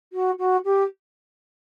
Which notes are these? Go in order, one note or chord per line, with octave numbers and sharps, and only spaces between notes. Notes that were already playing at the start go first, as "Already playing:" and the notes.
F#4
F#4
G4